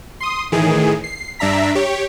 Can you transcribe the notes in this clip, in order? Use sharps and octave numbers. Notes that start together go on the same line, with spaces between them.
C6 D#6
A2 D#3 E3 G#4
C7
G2 D4 E5 A#5 B6
G4 C#5